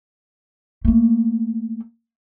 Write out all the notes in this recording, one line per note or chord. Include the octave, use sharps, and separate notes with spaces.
A3 A#3